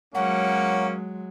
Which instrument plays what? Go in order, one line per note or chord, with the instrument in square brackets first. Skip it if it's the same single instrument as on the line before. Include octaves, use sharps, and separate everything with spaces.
[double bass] F#3 G#3 [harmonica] A#3 C#4 [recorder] F#5